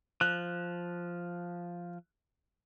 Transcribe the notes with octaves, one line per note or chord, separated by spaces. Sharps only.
F3 F#6